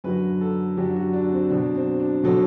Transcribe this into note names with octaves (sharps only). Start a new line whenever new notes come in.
F#2 D3 F#3 B4
A4
F#2 D3 F#3 G4
F#4
D4
C4
B2 F#3 D4
C4
D4
B2 F#3 A4